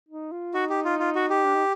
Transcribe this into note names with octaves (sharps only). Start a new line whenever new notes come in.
D#4
F4
D#4 F#4
G4
F4
F4
F#4
G4
D4
D#4